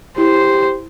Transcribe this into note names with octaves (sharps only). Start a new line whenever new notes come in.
E4 G4 C5